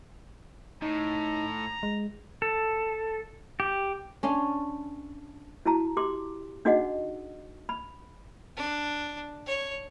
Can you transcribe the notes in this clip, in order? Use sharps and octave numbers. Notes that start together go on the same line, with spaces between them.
A2 D#4 A#5
G#3
A4
G4
C#4 D4 F5 C6
E4 F#4 A5 A#5
G4 C6 D6
D4 D#4 F#4 G#4 D#5 F#5
B5
D4
C#5